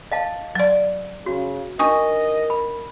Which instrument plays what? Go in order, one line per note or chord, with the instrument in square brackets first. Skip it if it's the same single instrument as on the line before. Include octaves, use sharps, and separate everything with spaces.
[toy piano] D#5 F5 A5
[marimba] F#3 D5
[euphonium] C#3 [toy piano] F#4
[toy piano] D4 D#4 [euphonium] A#4 [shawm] D#5 [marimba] C#6 D#6
[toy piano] B5